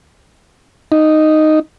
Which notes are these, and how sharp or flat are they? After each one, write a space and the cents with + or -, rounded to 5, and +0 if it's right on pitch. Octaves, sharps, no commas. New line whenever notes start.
D#4 -5